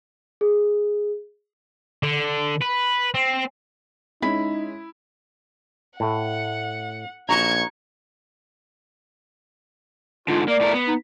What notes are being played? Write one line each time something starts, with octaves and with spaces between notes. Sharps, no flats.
G#4
D3
B4
C4
G#3 C#4 D#4 E4 B5
A2 A3 F#5
A#1 D#4 F#4 A#5 C#6 G#6
G#2 D3 F4
A#3 D5
A2 A3 A#4
B3
D#4